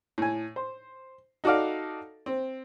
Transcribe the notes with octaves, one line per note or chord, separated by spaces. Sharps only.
A2 G#5
C5
D#4 F#4 A4 D5 F5
C4